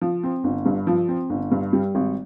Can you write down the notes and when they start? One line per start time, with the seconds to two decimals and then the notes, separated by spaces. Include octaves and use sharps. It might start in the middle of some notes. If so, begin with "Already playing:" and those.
0.01 F3
0.23 C4
0.44 G1
0.66 G2
0.87 F3
1.08 C4
1.30 G1
1.52 G2
1.73 G3
1.95 G#1